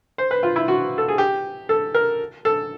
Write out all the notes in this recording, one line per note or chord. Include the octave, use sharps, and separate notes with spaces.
C5
B4
F4
E4
F#4
A4
G#4
G4
A4
A#4
A4